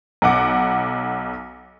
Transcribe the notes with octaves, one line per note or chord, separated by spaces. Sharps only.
B1 F#5 D6